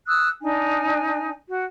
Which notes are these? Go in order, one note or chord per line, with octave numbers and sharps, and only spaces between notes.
D#6 E6 F#6
D4 D#4 G#5
F#4